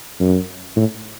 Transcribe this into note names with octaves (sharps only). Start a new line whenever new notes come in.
F#2
A2